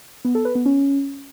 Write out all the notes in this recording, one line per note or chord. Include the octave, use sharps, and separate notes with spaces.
B3
A4
B4
B3
C#4